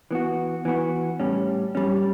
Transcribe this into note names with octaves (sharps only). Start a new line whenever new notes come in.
E3 B3 F#4
E3 B3 F#4
A2 G3 C#4
A2 G3 C#4